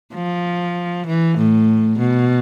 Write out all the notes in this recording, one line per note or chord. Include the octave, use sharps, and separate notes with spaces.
F3
E3
A2
B2